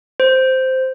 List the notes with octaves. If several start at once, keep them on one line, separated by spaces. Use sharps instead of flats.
C5